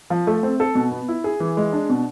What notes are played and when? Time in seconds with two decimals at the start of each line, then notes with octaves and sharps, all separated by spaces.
0.10 F3
0.27 A3
0.43 C4
0.60 A4
0.75 B2
0.91 B3
1.08 E4
1.24 G#4
1.40 E3
1.57 G#3
1.73 D4
1.90 B2